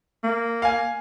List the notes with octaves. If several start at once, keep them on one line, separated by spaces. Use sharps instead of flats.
A#3
F5 G#5